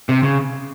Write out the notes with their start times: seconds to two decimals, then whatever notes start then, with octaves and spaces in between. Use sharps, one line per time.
0.09 C3
0.23 C#3